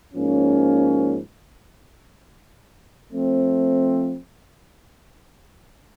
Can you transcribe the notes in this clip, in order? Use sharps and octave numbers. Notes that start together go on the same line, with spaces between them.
G#2 F3 A#3 C#4
F3 A3 C4